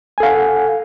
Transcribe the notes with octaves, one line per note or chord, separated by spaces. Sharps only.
A4 F5 F#5 G#5